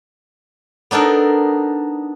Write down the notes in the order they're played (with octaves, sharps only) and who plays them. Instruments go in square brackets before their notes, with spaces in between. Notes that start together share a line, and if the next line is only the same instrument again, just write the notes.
[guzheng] B3 D4 D#4 A4 A#4